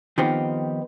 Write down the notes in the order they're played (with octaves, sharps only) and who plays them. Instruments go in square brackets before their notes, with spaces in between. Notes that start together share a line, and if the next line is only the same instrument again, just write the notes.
[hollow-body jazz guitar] D#3 F3 B3 C4 D#4 G4